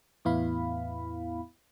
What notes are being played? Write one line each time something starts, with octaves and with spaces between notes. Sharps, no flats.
E2 A2 B3 E4 F5 B5